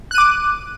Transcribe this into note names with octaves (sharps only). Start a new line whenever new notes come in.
D6 F#6 D#7